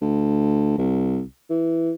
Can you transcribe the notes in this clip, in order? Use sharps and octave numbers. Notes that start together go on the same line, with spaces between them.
D2
C2
E3